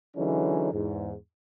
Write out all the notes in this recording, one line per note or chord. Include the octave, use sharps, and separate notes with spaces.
D3 E3 F#3 G#3 C#4 D#4
E2 G#2